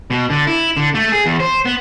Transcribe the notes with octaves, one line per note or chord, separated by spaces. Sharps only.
B2
D3
E4
D3
A3
G#4
E2
C5
B3